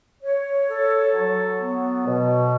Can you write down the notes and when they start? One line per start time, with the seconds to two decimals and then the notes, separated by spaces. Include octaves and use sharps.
0.23 C#5
0.69 A4
1.14 F#3
1.60 B3
2.05 B2